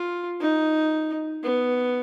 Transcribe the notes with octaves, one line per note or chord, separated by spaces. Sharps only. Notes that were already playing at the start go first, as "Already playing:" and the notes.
Already playing: F4
D#4
B3